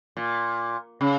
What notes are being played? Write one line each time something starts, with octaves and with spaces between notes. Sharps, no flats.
A#2
C#3